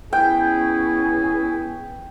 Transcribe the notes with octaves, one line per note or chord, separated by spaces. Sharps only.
B3 C#4 E4 G#4 G5